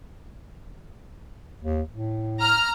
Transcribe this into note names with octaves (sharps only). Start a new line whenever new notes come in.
D#2
A2
A#5 F6